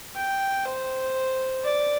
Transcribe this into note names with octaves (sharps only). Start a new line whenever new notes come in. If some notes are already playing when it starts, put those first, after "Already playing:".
G5
C5
D5